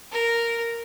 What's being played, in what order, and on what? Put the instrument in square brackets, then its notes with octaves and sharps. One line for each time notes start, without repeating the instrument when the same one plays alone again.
[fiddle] A#4